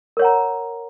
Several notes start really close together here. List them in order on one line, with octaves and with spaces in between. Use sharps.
A#4 C#5 F#5 A#5